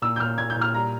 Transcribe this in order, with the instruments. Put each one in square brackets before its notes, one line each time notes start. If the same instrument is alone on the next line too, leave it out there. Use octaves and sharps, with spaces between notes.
[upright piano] A#2 E6
G6
A#2 F6
A#2 G#6
G6
A#2
F6
G3 A#5